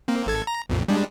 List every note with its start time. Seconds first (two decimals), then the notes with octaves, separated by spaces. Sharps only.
0.08 A#3 C4
0.26 G#1 A4 G#6
0.47 A#5
0.69 B1 F2 A#2
0.88 G3 G#3 D4